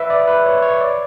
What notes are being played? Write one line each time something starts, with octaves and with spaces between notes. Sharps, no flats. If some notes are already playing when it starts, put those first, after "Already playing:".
Already playing: B4 E5
D5
B4
C#5
C#5
D5